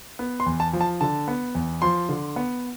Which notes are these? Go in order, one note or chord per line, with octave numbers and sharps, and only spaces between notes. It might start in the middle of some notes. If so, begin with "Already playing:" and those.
B3
C6
E2
A5
F3
A5
D3 A5
B3
E2
F3 C6
D3
B3